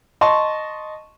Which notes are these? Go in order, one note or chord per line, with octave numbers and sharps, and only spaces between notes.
D#5 A5 C6 C#6